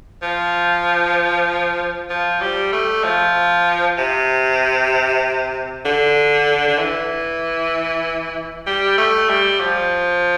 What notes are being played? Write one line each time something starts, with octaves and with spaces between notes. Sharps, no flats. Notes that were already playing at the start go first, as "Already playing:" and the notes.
F3
F3
G3
A3
F3
C3
D3
D3
E3
G3
A3
G3
F3